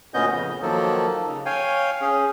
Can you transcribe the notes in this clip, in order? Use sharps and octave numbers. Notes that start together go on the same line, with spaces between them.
D2 A#2 B3 C#4 D#5 G6
F2 C#3
D#3 F3 F#3 A#3 A4
C#3
C#5 F5 G5 G#5
C#4 G#4